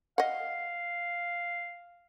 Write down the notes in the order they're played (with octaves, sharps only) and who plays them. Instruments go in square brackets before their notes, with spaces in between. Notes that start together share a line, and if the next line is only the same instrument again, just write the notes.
[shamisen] D#5 F#5 [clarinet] F5